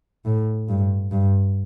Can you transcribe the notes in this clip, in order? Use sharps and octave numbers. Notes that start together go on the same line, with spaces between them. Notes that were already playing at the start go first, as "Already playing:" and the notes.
A2
G2
G2